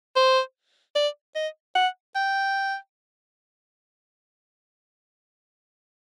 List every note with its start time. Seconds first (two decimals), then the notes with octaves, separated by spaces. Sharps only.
0.16 C5
0.96 D5
1.35 D#5
1.75 F#5
2.16 G5